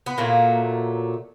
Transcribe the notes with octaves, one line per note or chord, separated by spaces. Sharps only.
B3
A#2 F#3 A3 A#3